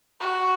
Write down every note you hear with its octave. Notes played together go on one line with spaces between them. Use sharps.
F#4